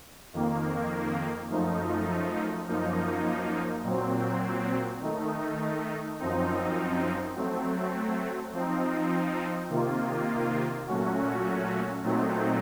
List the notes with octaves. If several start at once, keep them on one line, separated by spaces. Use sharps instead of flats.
F2 D#3 A#3
F#2 F3 A3 D#4
F#2 F3 A#3 D#4
A#2 F#3 C4
D#3 A3 D#4
F#2 F3 C4 D#4
F#3 A3 C4
F3 C4 D#4
C3 D#3 A#3 F4
A#2 F#3 A3 C#4 F#4
A#2 F#3 A3 C4 D#4